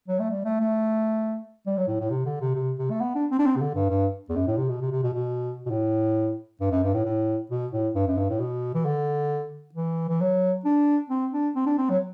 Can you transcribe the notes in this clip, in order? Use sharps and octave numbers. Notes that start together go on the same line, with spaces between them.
F#3
A3
G3
A3
A3
G3
F#3
A2
A2
C3
D3
C3
C3
C3
A3
B3
D4
C4
D4
C4
C3
D3
G2
G2
E2
F#2
A2
C3
B2
C3
C3
B2
B2
B2
A2
G2
F#2
G2
A2
A2
B2
A2
G2
F#2
G2
A2
B2
E3
D3
E3
E3
F#3
D4
C4
D4
C4
D4
C4
F#3